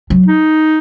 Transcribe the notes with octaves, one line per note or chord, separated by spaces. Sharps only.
F#3
D#4